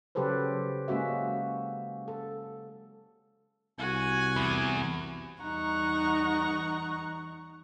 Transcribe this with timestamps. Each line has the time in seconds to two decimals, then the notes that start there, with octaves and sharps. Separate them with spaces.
0.15 C#3 F#3 G4 A4 B4 C5
0.88 G#3 A#3 C#4 F#4 E5
2.08 A4
3.79 C2 F#4 G#5
4.36 E2
5.41 E2 G3 D#4 F#5 A#5 C#6